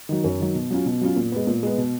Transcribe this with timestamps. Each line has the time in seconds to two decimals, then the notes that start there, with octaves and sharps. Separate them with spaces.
0.09 D#3 F#3
0.24 F#2
0.40 D#3 F#3
0.55 B2
0.70 F#3 C#4 F4
0.86 B2
1.01 F#3 C#4 F4
1.16 A#2
1.32 G#3 B3
1.47 A#2
1.63 G#3 B3
1.78 B2